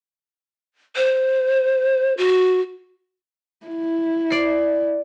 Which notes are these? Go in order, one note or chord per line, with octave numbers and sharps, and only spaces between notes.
C5
F#4
E4
D5 C7